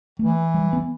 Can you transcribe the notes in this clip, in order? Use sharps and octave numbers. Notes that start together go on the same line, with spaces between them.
E3 A3
G3
B3